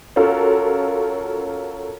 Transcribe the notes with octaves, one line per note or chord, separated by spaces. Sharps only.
C#4 F4 F#4 A4 A#4